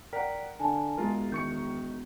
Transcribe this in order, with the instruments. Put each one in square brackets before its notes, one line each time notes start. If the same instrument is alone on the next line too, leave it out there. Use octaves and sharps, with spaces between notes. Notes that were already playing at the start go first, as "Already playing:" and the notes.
[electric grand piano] A#4 F#5 [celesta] D5 G5 B6
[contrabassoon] D3 [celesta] G#5 A5
[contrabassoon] E1 [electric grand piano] G#3 F4 A#4
[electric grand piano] D#3 C#6 C#7 [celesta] G6